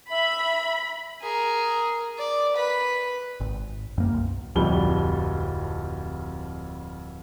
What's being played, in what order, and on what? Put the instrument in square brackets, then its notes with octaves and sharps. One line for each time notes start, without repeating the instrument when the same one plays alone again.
[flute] E5 [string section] B5
[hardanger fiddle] G#4 A#4
D5
B4 B5
[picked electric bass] G#1
F#2 A#3
B1
[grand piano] D1 F2 G3 G7